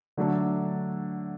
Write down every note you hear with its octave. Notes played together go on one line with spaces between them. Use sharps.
D3 F#3 A3 D4 A4